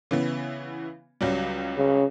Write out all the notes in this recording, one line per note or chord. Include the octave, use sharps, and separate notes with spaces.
C#3 E3 B3
C#2 F#3 G3
C#3